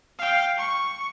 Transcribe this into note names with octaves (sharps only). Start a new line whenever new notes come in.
F5 G5
C#6